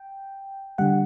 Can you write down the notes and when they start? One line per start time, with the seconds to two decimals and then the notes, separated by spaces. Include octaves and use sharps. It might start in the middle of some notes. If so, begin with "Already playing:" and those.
Already playing: G5
0.78 D3 G3 F#5